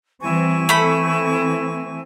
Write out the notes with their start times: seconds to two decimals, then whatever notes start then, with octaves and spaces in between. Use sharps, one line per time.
0.22 E3 G3 C4 E4 G#5 C#6
0.69 E3 A3 C4 B5